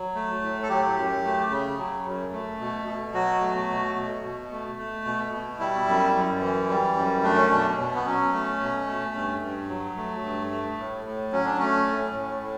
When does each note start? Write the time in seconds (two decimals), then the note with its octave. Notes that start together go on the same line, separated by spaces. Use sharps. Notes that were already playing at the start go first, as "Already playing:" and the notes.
Already playing: F#3
0.15 A3
0.42 A2
0.63 A4
0.69 F#3 G4
0.97 F#2
1.24 A3
1.50 C#3
1.78 F#3
2.06 F#2
2.32 A3
2.60 B2
2.88 B2
3.14 F#3 F#4
3.41 A3
3.69 B2
3.96 B2
4.23 B2
4.51 A3
4.78 A3
5.05 B2
5.33 B2
5.59 G3 E4
5.88 F#2
6.14 F#2
6.41 E3
6.69 G3
6.96 F#2
7.23 A3 D4
7.36 C#4
7.50 B2 D4
7.78 B2
7.95 B3
8.05 F#3 C#4
8.33 A3
8.60 B2
8.87 A3
9.14 G2
9.41 G2
9.68 F#3
9.97 A3
10.24 G2
10.50 A3
10.77 A2
11.05 A2
11.32 F#3 C#4
11.45 D4
11.58 A3 C#4
11.87 A2
12.14 A2
12.42 A2